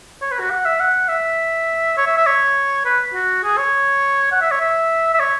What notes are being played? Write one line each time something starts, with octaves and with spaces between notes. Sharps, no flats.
C#5
B4
F#4
F#5
E5
F#5
E5
C#5
E5
E5
C#5
B4
F#4
G#4
C#5
F#5
E5
C#5
E5
E5
C#5